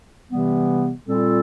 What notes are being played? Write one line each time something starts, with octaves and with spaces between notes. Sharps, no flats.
C3 E3 G3 B3
A#2 G3 C4 F4 A4